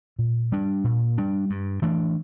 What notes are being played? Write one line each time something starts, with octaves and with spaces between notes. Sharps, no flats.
A#2
G3 D4
A#2
G3 D4
G2
E3 A3 D4